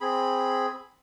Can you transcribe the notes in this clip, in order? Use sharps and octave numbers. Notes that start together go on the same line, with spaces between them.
C4 G#4 B5